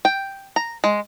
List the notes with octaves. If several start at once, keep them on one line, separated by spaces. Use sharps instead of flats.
G5
A#5
G#3